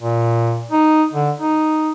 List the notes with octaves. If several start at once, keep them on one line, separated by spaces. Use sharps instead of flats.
A#2
D#4
D3
D#4